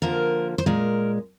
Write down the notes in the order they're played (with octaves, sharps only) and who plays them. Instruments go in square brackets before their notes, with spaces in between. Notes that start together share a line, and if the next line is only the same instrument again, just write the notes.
[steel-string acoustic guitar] D3 F3 A#3 A#4
C5
A#2 G#3 A#4